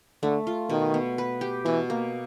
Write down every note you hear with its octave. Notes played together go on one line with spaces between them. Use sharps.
D3 A3
F4
B2 D#3
B3
B4
G4
B2 E3
A#3